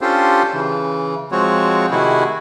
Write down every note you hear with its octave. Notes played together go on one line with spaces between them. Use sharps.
C#4 D4 F4 G4 A4 C5
C#3 E3
F3 G#3 C4 F#4 C#5
C3 D#3 A3 E4 F#4 G#4